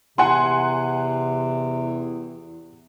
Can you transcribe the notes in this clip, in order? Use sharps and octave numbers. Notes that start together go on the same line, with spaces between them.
E2 C3 F#5 G#5 C6